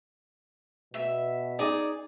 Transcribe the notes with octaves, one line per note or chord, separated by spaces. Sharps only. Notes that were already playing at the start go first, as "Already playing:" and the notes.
B2 E5
D#4 G#4 D5